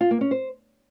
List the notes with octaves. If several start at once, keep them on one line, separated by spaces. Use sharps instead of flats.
F4
A#3
C#4
C5